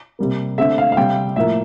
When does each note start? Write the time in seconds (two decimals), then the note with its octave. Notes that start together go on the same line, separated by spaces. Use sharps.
0.19 C3 G3 A#3
0.58 D3 A3 C4 E5
0.78 F5
0.92 F5
0.97 C3 G3 C4 G5
1.36 A2 F3 A#3 E5